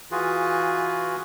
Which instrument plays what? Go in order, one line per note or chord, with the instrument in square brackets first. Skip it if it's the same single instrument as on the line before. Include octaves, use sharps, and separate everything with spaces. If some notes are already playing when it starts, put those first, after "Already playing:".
[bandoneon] E3 F4 F#4 G#4 B4